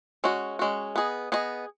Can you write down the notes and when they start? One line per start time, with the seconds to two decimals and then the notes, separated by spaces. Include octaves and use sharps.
0.24 G#3 C#4 F#4
0.59 G#3 C#4 F#4
0.96 B3 G#4 D#5
1.32 B3 G#4 D#5